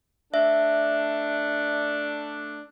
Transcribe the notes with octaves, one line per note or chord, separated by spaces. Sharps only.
A3 D4 E5